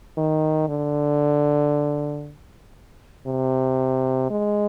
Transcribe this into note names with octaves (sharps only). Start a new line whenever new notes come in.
D#3
D3
C3
G#3